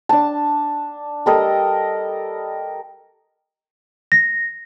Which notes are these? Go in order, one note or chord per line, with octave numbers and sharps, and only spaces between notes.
D4 A5
G3 A4 A#4 D#5
A#6